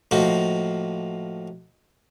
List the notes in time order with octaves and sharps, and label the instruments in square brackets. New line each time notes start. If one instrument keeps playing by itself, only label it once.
[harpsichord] A2 F3 A#3 D#4 F#4